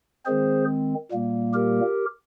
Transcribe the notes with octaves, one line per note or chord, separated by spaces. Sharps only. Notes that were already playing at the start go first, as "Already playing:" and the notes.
D#3 G#3 C4 G#4 C5
A#2 G3 A#3
G4 A#4